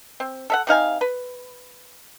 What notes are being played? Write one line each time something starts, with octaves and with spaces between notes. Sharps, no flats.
C4
A4 E5 F#5
C3 D#4 F5 G#5
B4